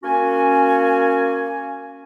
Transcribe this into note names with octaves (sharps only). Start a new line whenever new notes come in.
A#3 C#4 F#4 G#5